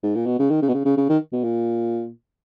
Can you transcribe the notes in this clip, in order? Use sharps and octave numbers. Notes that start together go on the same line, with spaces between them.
G#2
A#2
B2
C#3
D#3
C#3
B2
C#3
C#3
C#3
D#3
B2
A#2